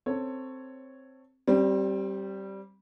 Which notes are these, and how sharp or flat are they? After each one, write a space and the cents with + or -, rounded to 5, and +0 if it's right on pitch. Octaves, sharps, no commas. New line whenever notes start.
C4 +0 A4 +15 C#5 +0
G3 -10 C4 +20